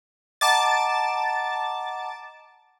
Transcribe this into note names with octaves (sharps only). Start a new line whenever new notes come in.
D#5 F#5 A5 A#5 D6 A6